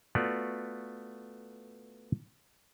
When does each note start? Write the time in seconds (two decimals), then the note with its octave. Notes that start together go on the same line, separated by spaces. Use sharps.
0.15 A3 B3 F4 F#4 D5